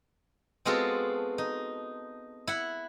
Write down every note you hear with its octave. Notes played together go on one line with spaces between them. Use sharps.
G#3 B3 C4 F4 F#4 A4
D#4
E4 F#5